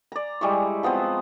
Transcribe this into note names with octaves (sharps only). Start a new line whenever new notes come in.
D5 A#5
G3 G#3 E4 C#6
F3 B3 C4 C5